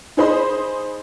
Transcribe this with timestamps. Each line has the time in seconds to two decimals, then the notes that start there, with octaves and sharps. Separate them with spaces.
0.17 D#4 G#4 C5 D#5 B5 C6